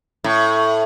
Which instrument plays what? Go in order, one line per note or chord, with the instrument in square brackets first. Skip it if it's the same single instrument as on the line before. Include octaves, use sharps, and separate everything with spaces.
[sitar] A2